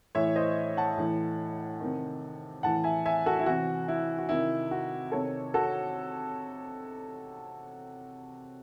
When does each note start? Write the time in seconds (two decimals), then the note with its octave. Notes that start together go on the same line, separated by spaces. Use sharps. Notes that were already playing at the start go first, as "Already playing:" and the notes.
0.15 A2 E3 C#5 E5
0.36 C5 D#5
0.77 F#5 A5
0.98 A2 E3
1.80 C3 D#3
2.63 A2 E3 F#5 A5
2.84 E5 G#5
3.06 E5 G#5
3.26 F#4 A4
3.39 E4
3.46 C3 E3 F#4
3.88 E4
4.18 F#4
4.29 C3 D#3 E4
4.71 F#4
5.12 C3 D#3 A4 C#5
5.54 F#4 A4